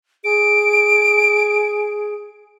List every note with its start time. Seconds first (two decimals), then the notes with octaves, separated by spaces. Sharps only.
0.24 G#4 D7